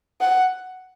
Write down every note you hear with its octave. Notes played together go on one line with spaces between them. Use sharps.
F#5